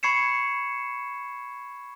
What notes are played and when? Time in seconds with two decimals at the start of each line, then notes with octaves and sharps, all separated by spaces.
0.03 B5 C#6 G#6 C7 C#7 E7